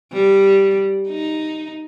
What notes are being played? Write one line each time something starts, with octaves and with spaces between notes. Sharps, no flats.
G3
D#4